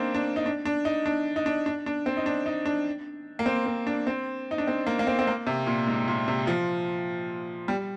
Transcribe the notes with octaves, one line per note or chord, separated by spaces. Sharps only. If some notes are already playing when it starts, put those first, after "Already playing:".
Already playing: A#3 C4 D4 D#4
D4
D#4
D4
D4
D#4
D4
D#4
D4
D4
D4
C4
D#4
D4
D#4
D4
A#3
C4
C4
D4
C4
D#4
D4
C4
A#3
A#3
C4
C4
A#3
C3
A#2
G#2
A#2
C3
F3
G3